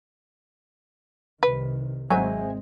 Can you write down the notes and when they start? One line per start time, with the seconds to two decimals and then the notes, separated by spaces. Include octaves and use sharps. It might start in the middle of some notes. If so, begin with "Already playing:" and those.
1.43 C2 C3 D#3 B4
2.10 G#1 F#3 G#3 C4 C5 E5 G#5